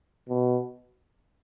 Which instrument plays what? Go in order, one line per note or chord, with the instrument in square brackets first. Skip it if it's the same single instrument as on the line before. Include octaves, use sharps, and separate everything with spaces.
[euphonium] B2